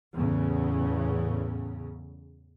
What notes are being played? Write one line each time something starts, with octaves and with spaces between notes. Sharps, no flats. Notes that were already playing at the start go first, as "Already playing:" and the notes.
E2 A2 C#3